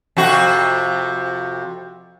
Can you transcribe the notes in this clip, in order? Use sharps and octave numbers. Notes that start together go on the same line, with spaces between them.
F2 C3 F#4